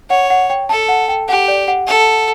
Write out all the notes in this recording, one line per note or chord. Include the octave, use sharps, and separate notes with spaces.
C#5 F#5
F#5
G5
A4 A5
F#5
G5
G4 F#5
D5
F#5
A4